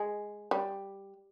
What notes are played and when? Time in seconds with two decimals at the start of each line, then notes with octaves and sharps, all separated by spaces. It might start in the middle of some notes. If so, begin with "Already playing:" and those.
Already playing: G#3
0.51 G3